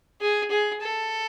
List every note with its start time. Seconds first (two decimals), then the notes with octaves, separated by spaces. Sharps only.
0.22 G#4
0.51 G#4
0.82 A4